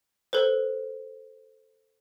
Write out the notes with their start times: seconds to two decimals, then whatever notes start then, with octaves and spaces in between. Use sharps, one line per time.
0.33 A4 B4 C5